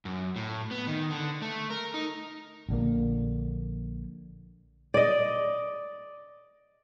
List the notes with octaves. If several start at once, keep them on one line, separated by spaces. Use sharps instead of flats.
F#2
A2
B3
D#3
D3
A3
A#4
D#4
A#1 D3 A#3
D5 D#5